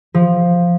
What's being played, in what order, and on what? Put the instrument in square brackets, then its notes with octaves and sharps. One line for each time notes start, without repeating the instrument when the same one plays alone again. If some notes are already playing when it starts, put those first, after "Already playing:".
[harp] F3